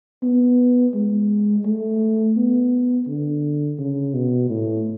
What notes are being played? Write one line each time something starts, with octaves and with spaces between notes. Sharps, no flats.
B3
G#3
A3
B3
D3
C#3
B2
A2